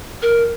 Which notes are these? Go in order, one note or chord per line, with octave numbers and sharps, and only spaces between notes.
A#4